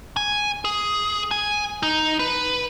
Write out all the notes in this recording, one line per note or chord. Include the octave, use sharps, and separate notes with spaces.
G#5
G#4
G#5
D#4
B4